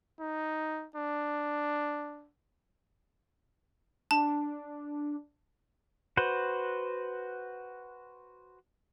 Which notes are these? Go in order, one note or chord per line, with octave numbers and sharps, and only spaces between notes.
D#4
D4
D4 A5
F#4 B4 C5